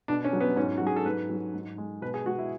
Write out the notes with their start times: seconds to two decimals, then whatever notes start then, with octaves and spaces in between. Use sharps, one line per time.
0.08 B2 D4
0.24 C#4
0.33 F#3
0.40 B3
0.56 G#2 C#4
0.78 F#3 F#4
0.87 G#4
0.96 A4
1.06 G#2 B4
1.30 F#3
1.54 G#2
1.78 G#3
2.02 B2 B4
2.14 G#4
2.26 G#3 F#4
2.39 E4